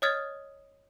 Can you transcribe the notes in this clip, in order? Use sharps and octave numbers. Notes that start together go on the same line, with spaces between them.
C#5 D#5 D#6 F6 G#6 A6